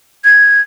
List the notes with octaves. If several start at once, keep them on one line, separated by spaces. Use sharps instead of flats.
G#6